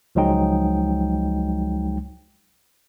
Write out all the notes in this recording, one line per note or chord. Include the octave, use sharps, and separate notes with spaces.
C#2 F3 F#3 G#3 D#4 G5